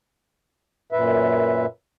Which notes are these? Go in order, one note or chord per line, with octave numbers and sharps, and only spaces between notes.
F#2 A#2 B4 E5